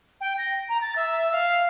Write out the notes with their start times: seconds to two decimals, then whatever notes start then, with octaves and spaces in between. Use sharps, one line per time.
0.21 G5
0.38 A#6
0.69 A#5
0.81 A6
0.96 E5
1.32 F5